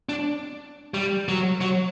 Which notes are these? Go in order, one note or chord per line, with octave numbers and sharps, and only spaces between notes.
D4
G3
F#3
F#3